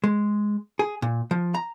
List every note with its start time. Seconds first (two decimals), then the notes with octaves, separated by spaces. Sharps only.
0.04 G#3
0.79 G#4
1.02 A#2
1.31 F3
1.55 A#5